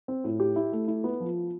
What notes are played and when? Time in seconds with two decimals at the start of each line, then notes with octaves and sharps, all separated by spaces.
0.08 C4
0.24 A2
0.40 G4
0.56 E4
0.72 A3
0.88 E4
1.04 B3
1.20 F3